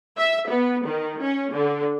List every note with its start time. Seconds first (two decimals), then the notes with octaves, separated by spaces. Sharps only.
0.18 E5
0.49 B3
0.85 D#3
1.22 C#4
1.53 D3